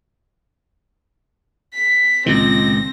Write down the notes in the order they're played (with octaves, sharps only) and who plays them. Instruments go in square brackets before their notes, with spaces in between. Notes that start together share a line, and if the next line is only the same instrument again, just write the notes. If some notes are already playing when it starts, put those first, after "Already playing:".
[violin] B6
[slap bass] C#2 A#2 D#3 [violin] C4 A#6